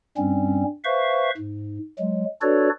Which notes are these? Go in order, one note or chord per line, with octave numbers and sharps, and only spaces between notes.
G2 G3 C4 C#4
B4 C5 E5 F5 C#6
G#2
F#3 G#3
D4 F#4 A4 B4 C#5 D5